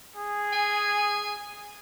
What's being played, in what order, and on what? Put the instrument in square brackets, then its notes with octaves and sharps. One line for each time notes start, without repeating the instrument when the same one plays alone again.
[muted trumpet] G#4
[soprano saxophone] G#5